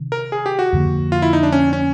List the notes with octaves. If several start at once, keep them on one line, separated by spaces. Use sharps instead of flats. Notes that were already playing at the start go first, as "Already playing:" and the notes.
Already playing: C3 D#3
A#4
G#4
G4
F#4
F2 D3 F3 A#3
F4
E4
D#4
D4
C#4
C#4